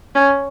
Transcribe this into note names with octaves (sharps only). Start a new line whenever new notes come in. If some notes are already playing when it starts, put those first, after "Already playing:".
C#4